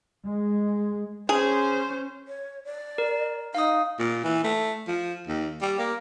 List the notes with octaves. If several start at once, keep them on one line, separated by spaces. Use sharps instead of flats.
G#3
C#4 G#4 C5
C#5
D5
A#4
D#4 F5 D#6
A#2
E3
A3
F3
D#2
G3
A#3